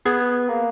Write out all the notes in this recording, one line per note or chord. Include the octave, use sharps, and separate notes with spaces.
B3 G#4
A#3